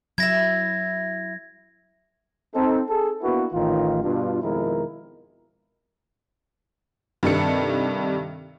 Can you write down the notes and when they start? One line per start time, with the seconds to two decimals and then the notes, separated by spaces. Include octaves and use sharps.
0.18 F#3 E4 E5 G#6 A#6
2.54 C4 D#4 A4
2.89 G#4 A4
3.22 A#3 B3 D4 E4 F#4 B4
3.53 A1 D#3 F4
4.03 G2 B2 D4 F4
4.42 F2 B2 D#3 G#3 E4 A#4
7.23 G2 C3 D#3 D4 A4 C#7